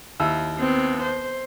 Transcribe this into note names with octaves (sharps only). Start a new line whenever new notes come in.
D#2 E4 E6
B3 C4
C5